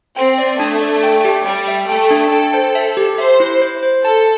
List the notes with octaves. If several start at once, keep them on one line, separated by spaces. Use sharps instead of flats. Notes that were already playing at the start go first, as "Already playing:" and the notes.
C4 G5
D5
A3 D4
D5
G5
G4
G3 G5
E5
A3 G5
D4
A4 G5
C5
E5
G4
C5 E5
E4
C5
C5
A4 A5